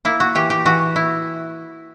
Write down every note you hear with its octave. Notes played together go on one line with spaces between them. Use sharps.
A#3 E4
F#4
E3 G4
G4
E3 F#4
E4